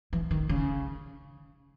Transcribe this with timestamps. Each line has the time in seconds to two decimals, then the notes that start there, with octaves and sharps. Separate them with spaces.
0.13 E3
0.31 D#3
0.49 C#3